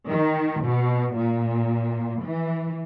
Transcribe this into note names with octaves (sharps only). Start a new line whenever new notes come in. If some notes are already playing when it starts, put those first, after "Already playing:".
D#3
B2
A#2
E3